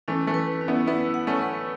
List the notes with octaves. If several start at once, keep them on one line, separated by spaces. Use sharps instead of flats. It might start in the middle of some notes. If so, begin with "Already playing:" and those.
E3 A3 C#4
E3 A3
B4
C#4
B3 E4
B3 E4 B4
F#5
A3 C#4
B4